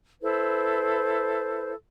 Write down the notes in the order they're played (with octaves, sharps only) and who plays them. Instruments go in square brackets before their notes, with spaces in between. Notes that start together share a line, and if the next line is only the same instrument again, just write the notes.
[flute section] E4 A4 B4 C5